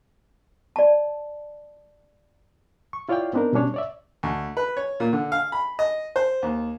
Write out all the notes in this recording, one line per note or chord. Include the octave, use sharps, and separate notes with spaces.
D5 A5
C#6
E4 F4 C#5 D5 F5 G5
B3 C4 D4 D#4 A#4
B2 G3 C#4 D4 C#5
C#5 D5 E5
D2
B4
C#5
A#2
D3
F5
B5
D#5
C5
D#2